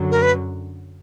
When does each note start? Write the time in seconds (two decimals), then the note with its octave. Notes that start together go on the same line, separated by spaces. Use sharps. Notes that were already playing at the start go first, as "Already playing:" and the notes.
Already playing: F#2 D3 F#3
0.11 A#4
0.22 B4